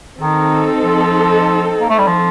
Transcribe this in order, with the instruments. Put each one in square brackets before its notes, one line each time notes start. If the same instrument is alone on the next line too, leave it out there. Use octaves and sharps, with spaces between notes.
[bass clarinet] D#3 [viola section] C4 D#4 A4
[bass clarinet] F3
A#3
A3
G3
F3